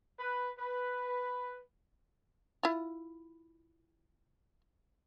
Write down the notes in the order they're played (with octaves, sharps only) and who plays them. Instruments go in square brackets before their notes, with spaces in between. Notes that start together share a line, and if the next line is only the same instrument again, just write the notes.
[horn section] B4
B4
[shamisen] E4 F4